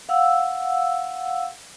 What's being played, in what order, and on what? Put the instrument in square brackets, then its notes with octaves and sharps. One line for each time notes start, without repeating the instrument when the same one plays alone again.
[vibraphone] F5 F#5 E6